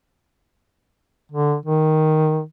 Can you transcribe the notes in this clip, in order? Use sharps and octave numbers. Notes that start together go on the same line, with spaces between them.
D3
D#3